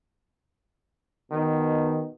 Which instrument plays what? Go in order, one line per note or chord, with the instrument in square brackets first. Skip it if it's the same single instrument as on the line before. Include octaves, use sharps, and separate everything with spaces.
[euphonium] B2 [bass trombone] D#3